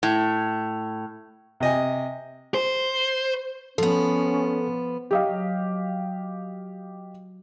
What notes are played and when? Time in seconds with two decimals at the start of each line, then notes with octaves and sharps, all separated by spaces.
0.03 A2
1.60 C3 D#5 G#5
2.54 C5
3.78 F3 B3 C#4 A4
5.11 F#3 G4 D#5 F5